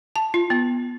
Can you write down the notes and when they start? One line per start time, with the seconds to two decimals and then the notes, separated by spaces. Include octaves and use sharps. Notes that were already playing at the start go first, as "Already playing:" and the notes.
0.16 A5
0.34 F4
0.50 B3